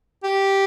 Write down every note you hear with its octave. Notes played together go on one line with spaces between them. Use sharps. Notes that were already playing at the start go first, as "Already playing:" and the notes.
G4